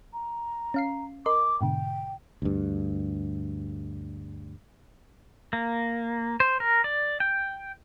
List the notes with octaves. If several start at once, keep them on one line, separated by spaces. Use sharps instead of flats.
A#5
C#4 F5 C7
A#4 D#5 C6 D6
G#2 B2 D3 G5
D2 G2
A#3
C5
A#4
D5
G5